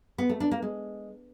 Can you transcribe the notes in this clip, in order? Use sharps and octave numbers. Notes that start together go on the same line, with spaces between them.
B3
A3
D4
A#3
G#3